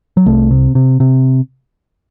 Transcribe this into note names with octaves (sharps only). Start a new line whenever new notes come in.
F#3
C2 A3
C3
C3
C3